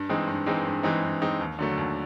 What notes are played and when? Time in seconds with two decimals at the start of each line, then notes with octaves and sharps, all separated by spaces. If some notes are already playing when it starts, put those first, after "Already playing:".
Already playing: G2
0.09 E3 G#3 C4 D#4
0.28 G2
0.46 E3 G#3 C4 D#4
0.65 G2
0.83 E3 G#3 C4 D#4
1.03 G2
1.21 E3 G#3 C4 D#4
1.41 D#2
1.59 D3 F#3 A3
1.78 D#2